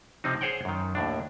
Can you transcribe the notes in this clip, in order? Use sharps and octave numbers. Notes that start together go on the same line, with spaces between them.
C3 F3 C4 D#4
G#4 C5 C#5 F#5 G5
F#2 D#3
D#2 A2 D4